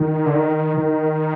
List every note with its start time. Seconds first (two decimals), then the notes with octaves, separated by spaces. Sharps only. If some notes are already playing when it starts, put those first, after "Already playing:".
Already playing: D#3
0.26 D3
0.34 D#3
0.77 D#3